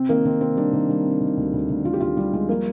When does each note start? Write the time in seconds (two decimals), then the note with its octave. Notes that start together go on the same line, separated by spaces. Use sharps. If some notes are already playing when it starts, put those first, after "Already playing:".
Already playing: C3 C4
0.09 D#3 A#3
0.25 D#3 C4
0.41 C3 C4
0.57 G3 D4
0.73 D#3
0.89 G3
1.05 C3
1.21 D#3
1.37 D2
1.53 D2
1.69 D2
1.85 D#3 F4
1.93 G4
2.00 D2 F4
2.17 G3
2.33 G3 G#3
2.49 F3 A#3